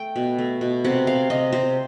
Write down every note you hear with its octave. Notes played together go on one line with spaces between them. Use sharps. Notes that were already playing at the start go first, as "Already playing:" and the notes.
Already playing: A3 G5
B2
A3
B2
C3 F#5
C3 F5
C3 D#5
C3 C5